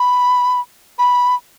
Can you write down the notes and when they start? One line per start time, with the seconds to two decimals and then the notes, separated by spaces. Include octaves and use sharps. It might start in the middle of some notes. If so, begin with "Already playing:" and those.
Already playing: B5
0.98 B5